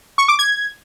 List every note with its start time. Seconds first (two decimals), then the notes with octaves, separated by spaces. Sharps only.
0.18 C#6
0.28 D6
0.39 G#6